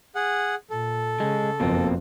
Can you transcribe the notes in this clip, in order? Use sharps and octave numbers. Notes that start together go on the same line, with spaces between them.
G#4 F#5
A#2 A4
C#3 G#3
F#1 F2 B2 A#3 C4